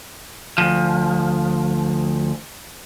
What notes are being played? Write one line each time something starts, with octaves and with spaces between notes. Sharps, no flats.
D2 F3